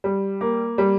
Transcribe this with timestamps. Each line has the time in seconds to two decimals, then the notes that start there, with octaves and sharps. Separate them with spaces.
0.04 G3
0.41 A#3
0.78 G3